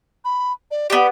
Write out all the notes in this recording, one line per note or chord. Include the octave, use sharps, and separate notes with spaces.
B5
D5
B3 G4 D5